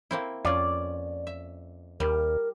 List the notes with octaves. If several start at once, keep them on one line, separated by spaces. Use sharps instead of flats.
A#3 C4 E4
F2 C#4 F4 D5
E5
D#2 G3 A#4